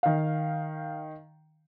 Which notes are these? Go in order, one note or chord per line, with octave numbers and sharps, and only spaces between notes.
D#3 F5